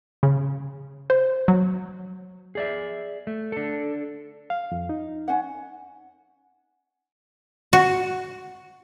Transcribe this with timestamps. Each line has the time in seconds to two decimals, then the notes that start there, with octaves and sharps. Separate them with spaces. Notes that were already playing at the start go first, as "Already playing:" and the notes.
0.23 C#3
1.10 C5
1.48 F#3
2.55 G#4 D5 E5
3.27 A3
3.52 D4 A4
4.50 F5
4.72 F2
4.89 D#4
5.28 C#4 F#5
7.73 F#4